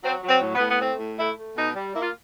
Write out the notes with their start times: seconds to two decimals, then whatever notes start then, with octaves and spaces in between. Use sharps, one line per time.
0.03 F#3 C4
0.23 F#3
0.29 C4
0.41 A2
0.54 B3
0.60 A2
0.68 B3
0.80 A3 C4
0.99 A2
1.18 A3 E4
1.37 A3
1.56 B2 D#4
1.75 G3
1.94 A#3 E4
2.02 F4